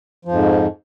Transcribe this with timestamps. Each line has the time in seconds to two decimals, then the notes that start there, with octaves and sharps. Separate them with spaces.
0.25 F3
0.28 F2
0.32 G#2